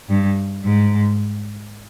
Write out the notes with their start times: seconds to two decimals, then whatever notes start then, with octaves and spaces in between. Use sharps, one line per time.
0.09 G2
0.64 G#2